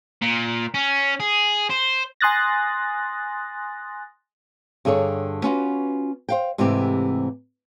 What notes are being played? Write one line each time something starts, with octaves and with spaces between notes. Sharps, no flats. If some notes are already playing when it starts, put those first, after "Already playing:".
A#2
C#4
G#4
C5
G#5 C6 D#6 F#6 A6 A#6
G2 D3 G#4 A4 C#5
B3 C#4 F4 F#4
C5 F5 G5
G#2 C3 E3 A3 C4 G4